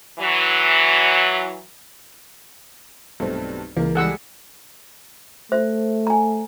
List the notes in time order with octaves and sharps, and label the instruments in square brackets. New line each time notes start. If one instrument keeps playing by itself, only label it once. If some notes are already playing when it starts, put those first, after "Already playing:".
[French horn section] E3 F#3
[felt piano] B1 [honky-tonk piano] G2 A3 C4
[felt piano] C#2 [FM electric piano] E3 [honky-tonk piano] A#3
[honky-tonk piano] G3 G#3 G#4 [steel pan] A4 F#5 E6
[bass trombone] A3 [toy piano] C5 E5
[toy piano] G#5 A#5